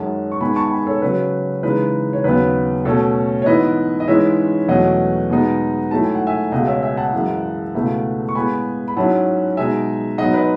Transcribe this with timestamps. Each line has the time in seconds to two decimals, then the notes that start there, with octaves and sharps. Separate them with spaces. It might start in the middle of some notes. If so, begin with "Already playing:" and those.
Already playing: F#2 D#3 G#3 C#4 F#5 A5
0.32 C#6
0.41 G#2 D#3 G#3 B3 G#5 B5
0.56 A5 C#6
0.71 G#5 B5
0.87 A4 C#5
1.02 C#3 F#3 C#4 B4
1.63 C#3 E3 G#3 D#4 B4
2.13 C#5
2.24 D#2 C#3 F#3 B3 B4
2.85 B2 A3 C#4 A4 C#5
3.42 C#5
3.46 G#2 E3 B3 E4 B4 D#5
4.00 D#5
4.08 G#2 E3 G#3 C#4 E4 C#5 E5
4.68 E2 B2 F#3 A3 C#4 D#5 F#5
5.30 B2 G#3 B3 D#4
5.91 G#2 F#3 A3 E4 A5
6.03 G#5
6.15 F#5
6.27 E5 G#5
6.52 C#2 B2 G#3 D#5 F#5
6.67 C#5 E5
6.82 E5 G#5
6.97 F#5 A5
7.13 F#2 E3 G#3
7.74 C#2 B2 A3 E4
8.29 C#6
8.35 A2 G#3 B3 G#5 B5
8.88 B5
8.96 G#2 F#3 C#4 E4 F#5 A5
9.57 B2 G#3 D#4 E5 G#5
10.18 G#2 F#3 B3 D#4 D#5 F#5
10.34 B4 D#5